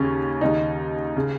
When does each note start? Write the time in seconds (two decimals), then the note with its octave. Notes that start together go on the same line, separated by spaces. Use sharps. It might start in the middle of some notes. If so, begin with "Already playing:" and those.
Already playing: D#2 C#3 C#4
0.41 D#2 C#3 D#4
1.16 C#3